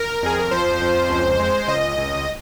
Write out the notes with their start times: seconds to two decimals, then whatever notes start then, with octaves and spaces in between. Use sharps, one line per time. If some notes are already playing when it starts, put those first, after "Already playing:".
Already playing: A#4
0.23 F2 G#4
0.39 A#4
0.51 F3 C5
0.81 F2
1.10 C#2
1.39 G#3
1.68 C#2 D#5
1.98 C#2